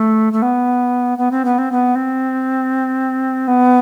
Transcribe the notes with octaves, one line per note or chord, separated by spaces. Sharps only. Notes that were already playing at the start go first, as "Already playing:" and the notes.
Already playing: A3
A3
B3
B3
C4
B3
C4
B3
C4
B3